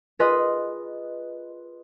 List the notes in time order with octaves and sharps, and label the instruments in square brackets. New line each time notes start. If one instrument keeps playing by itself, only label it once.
[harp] F4 G#4 B4 D#5 C6 D#6